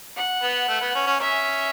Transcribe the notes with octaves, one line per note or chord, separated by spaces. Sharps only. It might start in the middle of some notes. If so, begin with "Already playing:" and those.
F#5
B3
A3
B3
C#4
C#4
C#4 E5